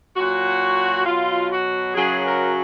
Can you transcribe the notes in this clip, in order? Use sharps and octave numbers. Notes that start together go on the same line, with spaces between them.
A#2 F#3 F#4
B2 F#3 F4
F#4
F#2 C#3 F#3 G#4
A#4